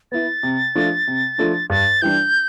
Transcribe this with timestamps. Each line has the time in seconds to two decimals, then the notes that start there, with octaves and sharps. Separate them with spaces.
0.12 B3 E4 A6
0.43 C3
0.75 F3 A3 D4 F4
1.07 C3
1.38 F3 A3 D4 F4
1.70 G2 A6
2.02 E3 G3 D4 G6